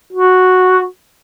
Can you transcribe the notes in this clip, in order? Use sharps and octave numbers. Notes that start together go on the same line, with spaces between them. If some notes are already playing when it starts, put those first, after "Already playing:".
F#4